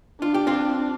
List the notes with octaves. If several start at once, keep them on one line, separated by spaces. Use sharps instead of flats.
D4 F4
G4
C4 F4